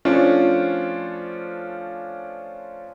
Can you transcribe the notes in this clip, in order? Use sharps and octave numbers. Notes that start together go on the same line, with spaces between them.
F3 A3 C#4 D4 F4 C5